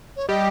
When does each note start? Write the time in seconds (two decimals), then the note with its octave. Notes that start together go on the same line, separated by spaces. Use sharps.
0.16 C#5
0.28 G3 G4 D#5